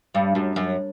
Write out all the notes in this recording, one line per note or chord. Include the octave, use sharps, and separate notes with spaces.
G2
F#2
F#2